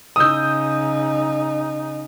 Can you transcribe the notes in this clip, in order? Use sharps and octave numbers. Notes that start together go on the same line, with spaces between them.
C#3 D#4 D#6 E6 G6